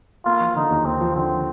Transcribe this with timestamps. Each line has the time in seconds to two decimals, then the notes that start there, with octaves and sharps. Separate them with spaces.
0.25 A#3 F4
0.40 F3
0.56 D3 D#4
0.71 D#2
0.85 A#3 C4
1.01 F3
1.16 D3 C4